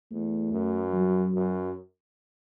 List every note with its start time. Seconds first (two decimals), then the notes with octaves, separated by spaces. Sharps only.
0.11 E2 A3
0.52 F#2
0.93 F#3
1.34 F#2